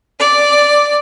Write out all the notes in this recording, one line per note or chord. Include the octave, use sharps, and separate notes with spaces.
D5